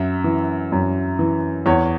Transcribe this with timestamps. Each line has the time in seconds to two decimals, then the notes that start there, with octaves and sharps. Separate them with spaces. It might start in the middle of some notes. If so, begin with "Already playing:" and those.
Already playing: F#2 E5
0.24 E3
0.72 F#2
1.19 E3
1.66 E2 C#5